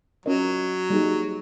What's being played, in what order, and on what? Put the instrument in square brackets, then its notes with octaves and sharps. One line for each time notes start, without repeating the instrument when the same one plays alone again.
[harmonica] F#3 [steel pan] C#4 F4 A#4 D#5
[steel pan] G3 A#3 D#4 G#4